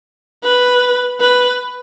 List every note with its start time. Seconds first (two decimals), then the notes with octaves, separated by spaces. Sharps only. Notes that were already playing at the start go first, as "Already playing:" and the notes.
0.44 B4
1.21 B4